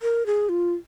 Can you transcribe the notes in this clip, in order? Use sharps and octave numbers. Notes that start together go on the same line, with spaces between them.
A#4
G#4
F4